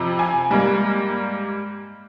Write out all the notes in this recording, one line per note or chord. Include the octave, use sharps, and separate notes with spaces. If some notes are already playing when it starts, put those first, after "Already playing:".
Already playing: F2 C3
G#5
G#2 G3 A#3